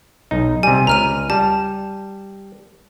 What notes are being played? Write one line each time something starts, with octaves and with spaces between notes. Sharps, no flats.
B1 D#4
C3 G3 G#5
C#2 A#5 F6 D#7
G3 A5